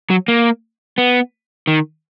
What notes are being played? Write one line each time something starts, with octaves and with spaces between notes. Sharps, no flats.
F#3
A#3
B3
D#3